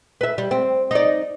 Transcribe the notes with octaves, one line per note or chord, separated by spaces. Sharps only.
B4 E5
G3
C4
D#4 D5